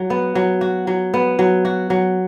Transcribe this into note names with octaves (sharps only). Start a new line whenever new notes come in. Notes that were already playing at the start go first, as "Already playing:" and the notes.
Already playing: F#3
B3
F#3
F#4
F#3
B3
F#3
F#4
F#3